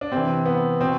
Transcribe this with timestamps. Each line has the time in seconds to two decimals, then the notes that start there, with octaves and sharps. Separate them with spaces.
0.01 D4
0.12 C3 E3 C4
0.46 B3
0.81 B2 C4